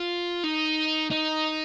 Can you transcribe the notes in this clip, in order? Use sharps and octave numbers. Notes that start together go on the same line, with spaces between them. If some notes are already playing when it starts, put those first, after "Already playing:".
Already playing: F4
D#4
D#4